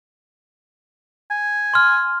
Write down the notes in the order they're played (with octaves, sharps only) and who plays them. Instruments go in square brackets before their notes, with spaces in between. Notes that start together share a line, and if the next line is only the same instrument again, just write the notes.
[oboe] G#5
[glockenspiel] C6 F6